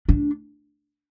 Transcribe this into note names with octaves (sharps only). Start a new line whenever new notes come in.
D4